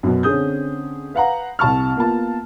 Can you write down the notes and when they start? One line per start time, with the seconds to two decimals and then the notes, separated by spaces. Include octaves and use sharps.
0.03 F#2 B2
0.23 D3 C4 C#4 G#4 D#6 G6
1.14 B4 F5 F#5 A#5
1.59 C2 C3 A5 C#6 F6
1.97 A#3 B3 F4 A5